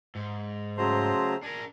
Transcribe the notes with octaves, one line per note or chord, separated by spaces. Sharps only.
G#2
C#3 F#3 A3 C5 A#5 C6
D4 A#4 G#5